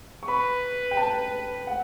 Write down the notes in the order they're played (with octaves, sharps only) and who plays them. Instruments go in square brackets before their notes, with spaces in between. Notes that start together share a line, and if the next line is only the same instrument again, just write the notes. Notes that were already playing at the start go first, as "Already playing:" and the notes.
[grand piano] C#6
[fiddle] B4 [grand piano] B5
[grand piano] G5
A5
F#5